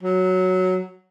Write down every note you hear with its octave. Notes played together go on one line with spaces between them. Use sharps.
F#3